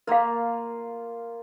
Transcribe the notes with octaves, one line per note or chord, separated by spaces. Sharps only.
A#3 F4 A#4 F5